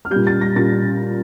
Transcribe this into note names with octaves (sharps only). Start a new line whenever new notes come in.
F6
A#2 G3 G6
A6
A#6
A#2 G3 A6